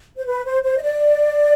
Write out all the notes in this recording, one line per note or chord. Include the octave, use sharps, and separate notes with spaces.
C5
B4
C5
C5
D#5
D5